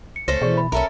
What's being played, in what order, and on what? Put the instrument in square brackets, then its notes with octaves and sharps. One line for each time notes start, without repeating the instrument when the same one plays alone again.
[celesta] C#7
[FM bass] C#2 [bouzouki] A3 C#4 C5 [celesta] A#6
[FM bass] B2 [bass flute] E3 [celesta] G#4 D5 C#6
[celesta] B5
[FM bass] B1 [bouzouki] C#4 A4 A#4 [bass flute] E5